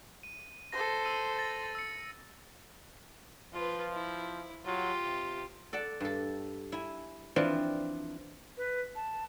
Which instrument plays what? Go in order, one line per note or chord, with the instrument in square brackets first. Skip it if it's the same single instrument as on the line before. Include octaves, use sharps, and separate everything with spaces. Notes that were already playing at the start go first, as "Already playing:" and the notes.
[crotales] D#7
[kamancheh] A4 C5 [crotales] A#6
[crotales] E6 D#7
A6 A#6
E6 C#7
[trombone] F3 [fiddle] F4 B4
[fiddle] E4
[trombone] F#3 [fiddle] F4 G4
[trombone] C3
[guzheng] A4 D5 F#5 A5
G2 A4
E4 G#5
E3 F3 C4 D4 E4 F4
[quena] B4
A5